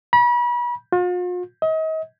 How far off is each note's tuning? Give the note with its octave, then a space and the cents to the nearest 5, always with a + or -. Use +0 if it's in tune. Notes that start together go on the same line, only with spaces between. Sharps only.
B5 -35
F4 +45
D#5 +35